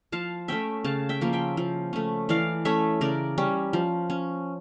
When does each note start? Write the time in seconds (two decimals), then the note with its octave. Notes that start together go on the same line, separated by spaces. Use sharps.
0.12 F3 F5 A5
0.48 A3 C#4 E5 G5
0.84 C#3 F5 A5
1.09 E5 G5
1.21 F3 A#3 C#4
1.33 E5 G5
1.57 F3
1.93 A3 C#4
2.29 E3 D5 F5
2.65 A3 C#4 C#5 E5
3.01 C#3 A#4 D5
3.38 G3 C#4
3.73 F3
4.10 C#4